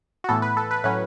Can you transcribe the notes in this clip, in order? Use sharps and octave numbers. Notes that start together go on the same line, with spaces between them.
F#4
A2 E3 B3 A4
B4
A4
B4
A2 F#3 C#4 B4